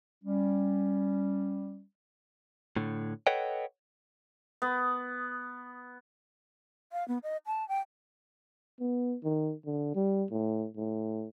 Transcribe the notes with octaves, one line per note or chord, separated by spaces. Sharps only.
G3 C#4
A2 D3
A4 B4 C#5 D#5 F#5 G5
B3
F5
B3
D#5
A5
G5
B3
D#3
D3
G3
A2
A2